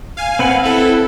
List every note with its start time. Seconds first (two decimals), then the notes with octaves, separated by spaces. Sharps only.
0.17 F5 G#5
0.39 C4 B4 F#5
0.63 E4 A4